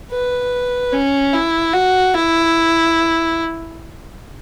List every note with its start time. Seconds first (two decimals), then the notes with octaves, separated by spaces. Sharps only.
0.11 B4
0.93 C#4
1.33 E4
1.74 F#4
2.14 E4